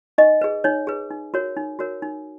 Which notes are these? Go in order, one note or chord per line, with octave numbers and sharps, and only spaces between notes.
D#4 D#5
G#4 B4
D#4 C#5
G#4 B4
D#4
F#4 A#4 C#5
D#4
F#4 A#4 C#5
D#4